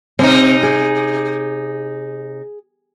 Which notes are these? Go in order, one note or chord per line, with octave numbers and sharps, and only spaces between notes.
C3 C4 D#4
G#4